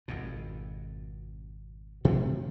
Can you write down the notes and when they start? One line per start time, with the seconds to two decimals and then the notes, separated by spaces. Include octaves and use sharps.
0.08 G#1 F2 B2
2.05 B2 E3 A3 C4